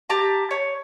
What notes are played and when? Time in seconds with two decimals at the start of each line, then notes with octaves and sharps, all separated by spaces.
0.10 G4 A5 A#5
0.51 C#5